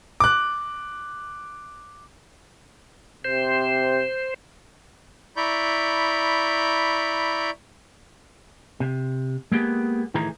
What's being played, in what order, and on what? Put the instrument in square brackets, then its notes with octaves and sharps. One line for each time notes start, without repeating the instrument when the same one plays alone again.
[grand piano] D6 F#6
[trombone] C3 [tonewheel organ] C5
[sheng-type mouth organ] E4 D5 A#5 B5 C#6 G6
[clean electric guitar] C3
G#3 A#3 B3 G4 G#4
A2 D#3 E3 G#4 A#5